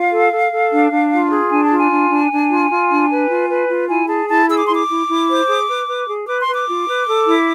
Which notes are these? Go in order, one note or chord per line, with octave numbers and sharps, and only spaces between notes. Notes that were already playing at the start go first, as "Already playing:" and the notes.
Already playing: F4 F5
A4
A4
A4
D4
D4
F4
G#4
D4 G#5
A5
F4
G#5
D4
D4
D4
F4
F4
D4
B4
F4
B4
F4
E4 G#5
G#4 A5
E4 A5
G#4 E6
D6
E4 C6
D6
E4
E4
C5
G#4
B4
B4
G#4
B4 D6
C6
B4
D6
F4
B4
A4
E4